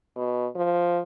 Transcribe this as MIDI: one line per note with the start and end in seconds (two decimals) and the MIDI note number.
0.16 0.47 47
0.55 1.01 53